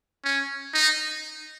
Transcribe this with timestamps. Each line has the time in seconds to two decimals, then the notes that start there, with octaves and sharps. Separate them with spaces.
0.25 C#4
0.74 D#4